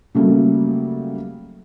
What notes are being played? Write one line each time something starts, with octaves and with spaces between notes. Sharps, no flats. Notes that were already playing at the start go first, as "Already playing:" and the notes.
C#3 F#3 G3 A3 A#3